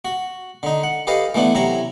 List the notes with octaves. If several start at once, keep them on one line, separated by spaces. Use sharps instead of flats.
F#4
D3 D#4
F#5
G4 A4 B4 D#5 F5
E3 A3 B3 D4
C3 F#3 E4 A#5